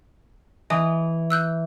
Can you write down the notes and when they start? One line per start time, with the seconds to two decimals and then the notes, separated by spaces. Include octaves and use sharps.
0.70 E3 D#5 G#5 D#6
1.30 E6 F#6 G6